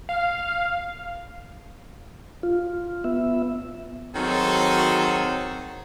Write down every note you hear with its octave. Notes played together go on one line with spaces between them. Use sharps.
F5
F4
B3 E5
D#3 F#3 C4 F#4 G#4 A4